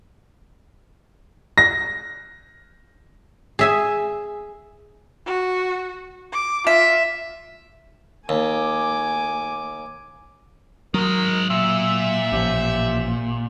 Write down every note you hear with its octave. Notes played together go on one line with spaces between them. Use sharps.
A#6
G#4 E5 G#5
F#4
D6
F4 E5
D#2 G#5 D6
D#3 F#3 G#3 A#4
A#2 E5 E6
A1 F3 G4